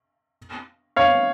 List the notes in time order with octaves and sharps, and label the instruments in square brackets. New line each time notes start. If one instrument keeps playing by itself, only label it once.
[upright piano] C#5 F5